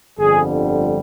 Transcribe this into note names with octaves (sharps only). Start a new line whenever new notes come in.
G1 F2 D3 G3 G#4